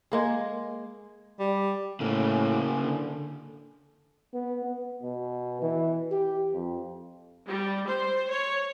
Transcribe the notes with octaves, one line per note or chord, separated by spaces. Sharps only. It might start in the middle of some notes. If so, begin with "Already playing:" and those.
G#3 A#3 G#4
G3
A2 C#3 A#3
D3
B3
B3
B2
E3
G4
F2
G3
C5
C#5